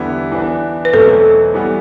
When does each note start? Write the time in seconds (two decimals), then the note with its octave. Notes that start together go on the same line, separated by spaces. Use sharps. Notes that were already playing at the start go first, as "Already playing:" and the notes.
Already playing: E2 D3 G3 B3 E4
0.32 E3 B3 D4
0.85 B4
0.93 E2 B2 F#3 A3 C4 A4
1.54 E3 G3 B3